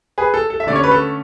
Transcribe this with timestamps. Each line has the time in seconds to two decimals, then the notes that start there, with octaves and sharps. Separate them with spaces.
0.18 G#4 B4
0.34 A4
0.50 A4
0.60 E5
0.67 D3 A3 C#4 D5
0.76 C#5
0.84 B4
0.91 A4